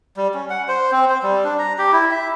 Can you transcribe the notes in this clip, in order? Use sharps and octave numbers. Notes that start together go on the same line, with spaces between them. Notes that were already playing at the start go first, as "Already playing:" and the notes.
G3
C#4
F#5
C5
C4
C5
G3
D4
A#5
G4
E4
E5